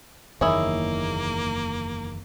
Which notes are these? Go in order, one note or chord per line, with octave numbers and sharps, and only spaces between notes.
F#1 E2 D#3 A#3 E4 G#4 C#5